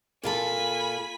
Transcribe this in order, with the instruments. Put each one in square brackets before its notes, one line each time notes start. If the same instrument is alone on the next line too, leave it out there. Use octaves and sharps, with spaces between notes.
[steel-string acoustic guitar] A#2 F4 A4 [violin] G#5 B5